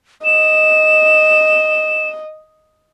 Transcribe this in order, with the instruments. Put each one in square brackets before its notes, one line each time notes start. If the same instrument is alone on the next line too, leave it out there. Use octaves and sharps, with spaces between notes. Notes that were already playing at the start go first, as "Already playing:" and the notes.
[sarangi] D#5 [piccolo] E7